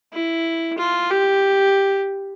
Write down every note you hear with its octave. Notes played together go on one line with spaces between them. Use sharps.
E4
F4
G4